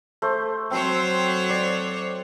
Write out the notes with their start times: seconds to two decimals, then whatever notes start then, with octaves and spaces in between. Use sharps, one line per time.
0.22 A3 C5
0.71 F#3 C4 C5 C#5 C6
1.50 D5